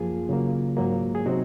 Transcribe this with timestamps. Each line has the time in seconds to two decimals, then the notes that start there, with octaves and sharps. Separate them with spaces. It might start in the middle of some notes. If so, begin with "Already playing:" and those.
Already playing: F#2 F3 A#3 F4 G#4
0.29 C#3 F#3 A#3
0.77 G#2 F#3 A#3
1.15 G#4
1.26 C3 F#3 C4 D#4 F#4